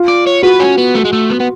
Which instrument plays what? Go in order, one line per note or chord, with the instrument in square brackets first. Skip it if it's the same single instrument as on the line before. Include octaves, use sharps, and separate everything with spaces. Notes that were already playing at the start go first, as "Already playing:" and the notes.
Already playing: [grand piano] F4
[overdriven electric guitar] D5
C#5
[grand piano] F#4 [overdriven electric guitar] B4
[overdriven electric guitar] C#4
B3
A3
G#3
A3
B3
B3